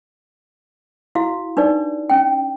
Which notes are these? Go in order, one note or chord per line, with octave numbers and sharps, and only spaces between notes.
E4 F#4 F5
D4 D#4 B4 D5
C#4 G5